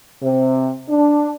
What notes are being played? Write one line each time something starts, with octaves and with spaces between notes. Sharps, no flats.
C3
D4